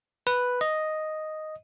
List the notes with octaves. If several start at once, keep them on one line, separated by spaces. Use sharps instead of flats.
B4
D#5